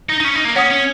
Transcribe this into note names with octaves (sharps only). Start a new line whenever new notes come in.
D#4
D#4
C#4
D#4
A#3
C#4 C#5 F#5 D#6
C#4